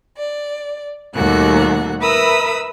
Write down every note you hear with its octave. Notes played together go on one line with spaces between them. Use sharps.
D5
D#2 B2 G3 A3 F#4 F#6
A#4 B4 E5 B5 D#6 E6